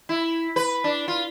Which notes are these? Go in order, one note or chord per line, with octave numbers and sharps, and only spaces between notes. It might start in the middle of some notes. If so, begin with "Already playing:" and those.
E4
B4
D4
F4